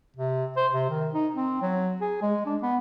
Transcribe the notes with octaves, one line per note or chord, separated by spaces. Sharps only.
C3
C5
C3
D#3
D#4
C4
F#3
G#4
G#3
D4
B3